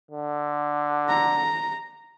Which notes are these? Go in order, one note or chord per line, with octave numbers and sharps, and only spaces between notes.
D3
A#5